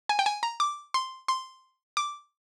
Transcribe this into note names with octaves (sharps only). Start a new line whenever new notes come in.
G#5
G5
G#5
A#5
D6
C6
C6
D6